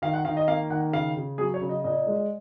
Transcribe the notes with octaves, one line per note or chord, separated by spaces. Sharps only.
D#3 F5
F#5
D#3 F5
D#5
A#3 F5
D#3 F#5
C#3 F5
C#3
F#3 G#4
C#5
C#3
D#5
A#2 D#5
G#3